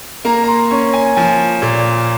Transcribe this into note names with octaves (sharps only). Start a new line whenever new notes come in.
A#3 A#5
A#5
C6
C#4 C#6
G#5
F3 G#5
A#2